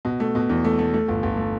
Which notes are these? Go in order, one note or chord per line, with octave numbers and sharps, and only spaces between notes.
B2
A3
B2
E2
A3
A3
A3
G1
G1
A3